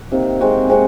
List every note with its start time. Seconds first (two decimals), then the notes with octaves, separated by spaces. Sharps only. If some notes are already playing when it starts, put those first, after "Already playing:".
Already playing: F#4
0.12 C3 D#3 A#3
0.41 G#3 C4 F#4
0.69 G#3 C4 F#4